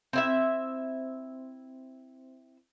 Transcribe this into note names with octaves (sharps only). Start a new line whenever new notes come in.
C4 E4 E5